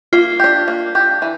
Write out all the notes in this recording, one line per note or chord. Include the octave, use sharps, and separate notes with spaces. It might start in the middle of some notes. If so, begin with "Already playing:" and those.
A#3 F4
D4 G4
A#3
D4 G4
E3